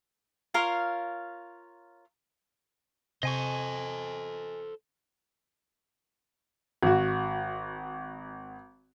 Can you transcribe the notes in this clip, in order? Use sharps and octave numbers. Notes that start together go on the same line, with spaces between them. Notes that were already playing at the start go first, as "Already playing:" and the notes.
F4 A#4 C#5 F5
C3 A4 C5 D#5 G#5 C#6
G#1 F#4